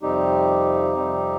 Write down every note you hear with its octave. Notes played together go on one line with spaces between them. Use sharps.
F2 C3 G3 C4 D#4 G4
F2 C3 G3 C4